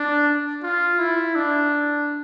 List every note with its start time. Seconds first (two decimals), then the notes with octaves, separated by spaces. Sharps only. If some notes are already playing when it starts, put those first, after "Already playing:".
Already playing: D4
0.62 F4
0.99 E4
1.36 D4